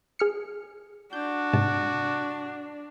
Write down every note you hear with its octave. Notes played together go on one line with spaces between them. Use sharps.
G#4 F6 C#7
D4 F#4 G6
G#2 C3 A5